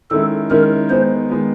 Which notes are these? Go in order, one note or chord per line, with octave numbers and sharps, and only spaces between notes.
D#3 G#3 C#4 E4 A4
D#3 G#3 C#4 E4 A#4
D#3 G#3 B3 C5
D#3 G#3 B3